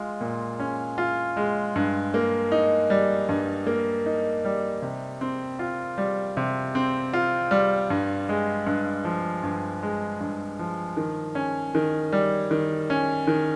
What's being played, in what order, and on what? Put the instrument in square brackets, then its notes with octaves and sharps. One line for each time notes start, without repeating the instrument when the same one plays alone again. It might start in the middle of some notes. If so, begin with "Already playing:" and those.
Already playing: [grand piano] G#3 F4
A#2
C#4
F4
G#3
G2
A#3
D#4
G3
G2
A#3
D#4
G3
C3
C4
F4
G3
C3
C4
F4
G3
G2
G#3
G2
F3
G2
G#3
G2
F3
D#3
C#4
D#3
G3
D#3
C#4
D#3